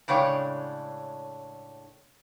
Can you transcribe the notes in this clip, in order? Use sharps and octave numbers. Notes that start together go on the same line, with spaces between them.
A2 C#3 G#3 D4 C#5 G5